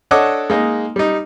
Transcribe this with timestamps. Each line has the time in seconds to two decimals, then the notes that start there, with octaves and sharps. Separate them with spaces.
0.11 D4 A4 C#5 D#5 F#5 D6
0.50 G#3 A#3 D#4
0.96 G3 D#4